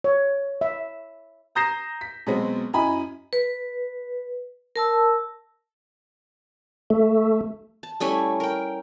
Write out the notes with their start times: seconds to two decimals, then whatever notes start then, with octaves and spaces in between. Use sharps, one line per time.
0.04 C#5
0.61 E5
1.55 A#5 D#6 G6 A#6 C7 E7
2.01 B6
2.26 B2 F#3 G#3 B3 C4
2.73 F#2 E4 D#5 G#5 B5
3.33 B4
4.76 A#4 A5 E6
6.90 A3
7.83 A5
8.00 G3 A3 C#4 E4
8.40 A#4 G5